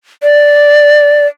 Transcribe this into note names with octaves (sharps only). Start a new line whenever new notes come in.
D5